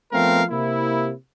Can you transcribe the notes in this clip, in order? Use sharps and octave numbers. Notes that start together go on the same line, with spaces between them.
F3 A3 B3 C4 A#4 F5
C3 A#3 E4